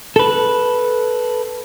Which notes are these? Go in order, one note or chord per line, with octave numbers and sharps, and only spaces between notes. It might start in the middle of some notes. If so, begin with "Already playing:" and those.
A4 B4